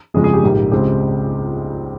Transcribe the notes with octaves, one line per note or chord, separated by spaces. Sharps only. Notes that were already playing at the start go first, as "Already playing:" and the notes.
G1 F2 C#3 F3 G#3 G#4
G#4
G4
A#1 G#2 G3 A#3
C#2 C#3 G#3 C4 G4